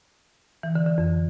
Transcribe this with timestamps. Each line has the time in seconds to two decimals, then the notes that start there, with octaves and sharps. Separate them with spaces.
0.63 E3
0.75 D3
0.87 D3
0.98 F2